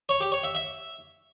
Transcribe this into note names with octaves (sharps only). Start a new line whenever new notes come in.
C#5
G4
C#5
E5
E5